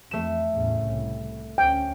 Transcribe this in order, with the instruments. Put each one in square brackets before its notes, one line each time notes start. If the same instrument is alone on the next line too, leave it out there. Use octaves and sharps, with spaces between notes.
[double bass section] F2 [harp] A3 E7
[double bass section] E2 A2 C#3
C2
[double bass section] D2 C#4 [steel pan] G5